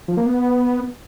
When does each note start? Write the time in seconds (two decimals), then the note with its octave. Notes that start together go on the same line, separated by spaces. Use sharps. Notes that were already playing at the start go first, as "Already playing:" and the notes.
0.08 F3
0.17 A#3
0.26 B3